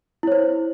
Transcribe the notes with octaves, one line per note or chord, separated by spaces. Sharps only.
E4 C5 C#5